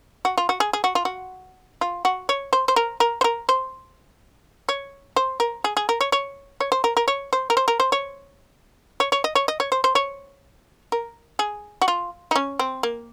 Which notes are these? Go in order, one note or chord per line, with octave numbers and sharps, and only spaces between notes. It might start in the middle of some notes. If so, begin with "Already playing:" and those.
F#4
F4
F#4
G#4
G#4
F#4
F4
F#4
F4
F#4
C#5
C5
C5
A#4
A#4
C5
A#4
C5
C#5
C5
A#4
G#4
G#4
A#4
C#5
C#5
C#5
C5
A#4
A#4
C#5
C5
A#4
C5
A#4
C5
C#5
C#5
C#5
D#5
C#5
D#5
C#5
C5
C5
C#5
A#4
G#4
F#4
F4
D#4
C#4
C4
A#3